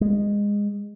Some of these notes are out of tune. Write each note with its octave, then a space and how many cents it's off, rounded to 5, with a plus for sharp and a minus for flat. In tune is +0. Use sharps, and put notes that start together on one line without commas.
G#3 -20